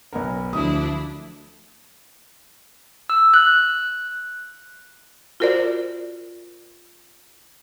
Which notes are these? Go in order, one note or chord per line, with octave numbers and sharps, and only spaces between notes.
B1 B3 A#4
D2 F3 D4 E4 D#6
E6
F#6
F4 F#4 A#4 C5 D5